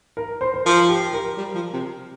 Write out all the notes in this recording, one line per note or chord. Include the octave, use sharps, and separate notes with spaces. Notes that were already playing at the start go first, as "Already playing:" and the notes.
A#4
C5
C5
F3 A#4
G4
A#4
G3
F3
C3